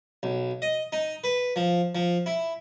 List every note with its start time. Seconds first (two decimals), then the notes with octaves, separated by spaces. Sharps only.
0.23 B1
0.62 D#5
0.92 D#4
1.24 B4
1.56 F3
1.95 F3
2.26 E4